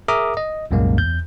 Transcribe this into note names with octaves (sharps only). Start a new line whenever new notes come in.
G#4 A#4 E5 A#5 D6 D#6
D#5
C2 F#2 A#2 G#3 A#3
E2 G6